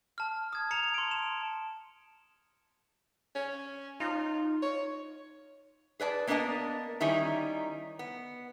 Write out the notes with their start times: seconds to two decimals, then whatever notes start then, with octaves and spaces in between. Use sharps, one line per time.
0.18 A5 F6
0.53 D#6 G#6
0.71 A5 A#5 C#7 F7
0.94 C6 D7
1.11 E7
3.35 C#4
4.00 D#4 F4
4.62 C#5
6.00 G#4 B4 D5 A5
6.27 A#3 B3 D4 A#4 D#5 A5
7.00 D#3 G3 C#4 D#4 E4
7.99 B3